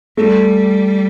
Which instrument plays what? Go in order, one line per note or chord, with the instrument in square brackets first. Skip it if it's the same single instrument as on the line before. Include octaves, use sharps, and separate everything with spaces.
[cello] G3 [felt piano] A3